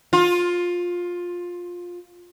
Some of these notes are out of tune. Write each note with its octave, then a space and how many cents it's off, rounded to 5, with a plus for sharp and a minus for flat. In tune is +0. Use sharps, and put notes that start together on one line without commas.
F4 +15